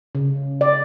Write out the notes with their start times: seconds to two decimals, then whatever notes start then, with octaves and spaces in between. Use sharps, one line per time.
0.15 C#3
0.61 D5